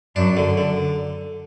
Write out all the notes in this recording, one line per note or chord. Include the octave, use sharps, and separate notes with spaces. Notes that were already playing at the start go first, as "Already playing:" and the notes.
F#2 D4
D3
D3